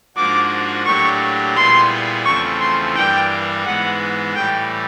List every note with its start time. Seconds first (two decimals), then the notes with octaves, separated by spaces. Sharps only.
0.16 G#2 F3 A#3 D4 F#4 D6
0.85 A2 F#3 A#3 D4 G4 C#6
1.56 A#2 G3 B3 E4 G#4 C6
2.25 E2 C#3 F3 A3 C4 C#6
2.61 C6
2.95 G2 E3 G3 A#3 D4 G5
3.66 G#2 E3 G#3 B3 F#5
4.35 A2 E3 G3 G5